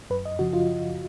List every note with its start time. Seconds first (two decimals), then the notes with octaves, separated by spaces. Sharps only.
0.10 F#2 B4
0.25 D#5
0.39 C#3 F3 F#4
0.53 F4